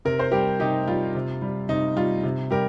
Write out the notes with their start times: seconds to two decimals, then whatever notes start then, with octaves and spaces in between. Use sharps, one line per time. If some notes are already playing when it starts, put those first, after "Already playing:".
0.05 C3 A#4
0.19 C5
0.32 G3 G4 A#4
0.60 C3 D#4 G4
0.88 G3 F4
1.15 C3
1.42 G3
1.69 C3 D#4
1.96 G3 F4
2.23 C3
2.51 G3 G4 A#4